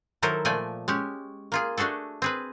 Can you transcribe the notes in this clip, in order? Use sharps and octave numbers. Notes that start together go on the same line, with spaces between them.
D#3 F#3 E4 A4 A#4 C5
A#2 F3 A3 D5 G5 G#5
G#3 C#4 G4
A#3 F4 G#4
A3 D4 F#4 G#4 A4
C4 G#4 B4